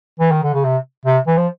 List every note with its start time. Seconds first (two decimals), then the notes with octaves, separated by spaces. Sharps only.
0.20 E3
0.32 D#3
0.43 D3
0.54 C#3
0.65 C3
1.06 C3
1.28 E3
1.37 F3